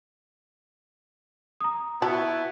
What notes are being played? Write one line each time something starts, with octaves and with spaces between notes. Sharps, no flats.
A#5 D#6
B3 E4 F#4 A5